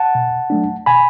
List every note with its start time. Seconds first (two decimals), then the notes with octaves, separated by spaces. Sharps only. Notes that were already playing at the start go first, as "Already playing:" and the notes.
Already playing: F#5 A5
0.15 B2
0.50 F#3 A3 D4
0.86 B2 G#5 B5